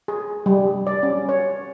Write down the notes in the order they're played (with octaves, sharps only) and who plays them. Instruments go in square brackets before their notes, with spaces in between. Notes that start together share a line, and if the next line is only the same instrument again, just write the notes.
[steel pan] G#4
G3
D5
C#4
C#5